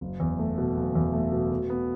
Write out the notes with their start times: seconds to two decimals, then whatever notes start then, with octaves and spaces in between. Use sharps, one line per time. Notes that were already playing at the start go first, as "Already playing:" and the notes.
0.01 F#1
0.20 E2
0.39 A3
0.58 B2
0.77 F#1
0.95 E2
1.13 A3
1.32 B2
1.51 B2
1.70 B3